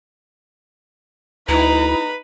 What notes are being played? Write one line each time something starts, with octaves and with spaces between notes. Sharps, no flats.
D2 D#4 E4 B4 A#5